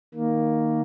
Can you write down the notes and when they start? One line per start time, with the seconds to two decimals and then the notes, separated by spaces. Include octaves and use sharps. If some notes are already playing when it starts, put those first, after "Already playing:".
0.14 D#3 A#3